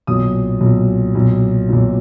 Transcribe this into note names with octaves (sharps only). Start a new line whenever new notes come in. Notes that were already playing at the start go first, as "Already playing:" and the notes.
B1 A#2 D#6
B1 A#2
B1 A#2
B1 A#2